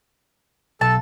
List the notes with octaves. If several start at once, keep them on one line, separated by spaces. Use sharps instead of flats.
B1 A4 A5